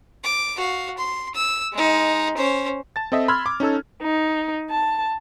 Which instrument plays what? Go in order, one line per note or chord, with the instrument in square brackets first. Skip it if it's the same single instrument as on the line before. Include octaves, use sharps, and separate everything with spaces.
[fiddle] D6
F#4 F5
C6
E6
G#3 D#4
C#4 C5
[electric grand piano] A5 A6
C4 A4 D#5 E5
B5 C6 E6 F6 G#6
D6
C#4 D#4 A4 E6
[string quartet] D#4
A5